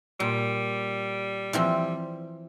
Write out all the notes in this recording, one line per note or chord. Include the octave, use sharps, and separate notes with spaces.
A#2 G3
E3 F3 C4